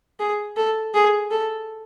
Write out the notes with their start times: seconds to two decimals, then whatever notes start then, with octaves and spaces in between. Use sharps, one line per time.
0.20 G#4
0.56 A4
0.94 G#4
1.31 A4